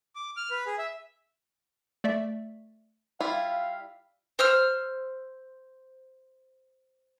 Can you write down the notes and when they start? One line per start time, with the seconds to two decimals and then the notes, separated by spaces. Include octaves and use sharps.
0.16 D6
0.37 F6
0.51 B4
0.67 G#4
0.78 E5
2.04 A3 D5 E5
3.20 G3 E4 F4 F5
4.39 C5 E6 F6